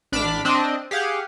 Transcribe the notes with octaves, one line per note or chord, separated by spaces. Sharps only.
A1 D4 B5 D6 F6 B6
C4 D4 D#5
G4 G#4 F5 F#5